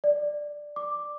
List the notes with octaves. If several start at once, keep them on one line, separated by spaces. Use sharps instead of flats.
D5
D6